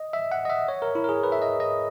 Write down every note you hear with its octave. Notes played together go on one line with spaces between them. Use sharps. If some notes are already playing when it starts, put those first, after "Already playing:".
Already playing: D#5
E5
F#5
D#5
E5
C#5
A#4
E4
A#4
G#4
B4
E5
D#5
D#5